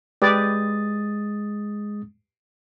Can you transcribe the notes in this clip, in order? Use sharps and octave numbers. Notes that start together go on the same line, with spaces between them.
G#3 G4 B4 D5 D#6 A6